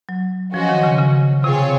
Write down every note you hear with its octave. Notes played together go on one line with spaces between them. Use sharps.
F#3
F3 C#4 F#4 C5 D#5 F#5
D#3
C#3
C#3
C3 C4 F4 G#4 C#5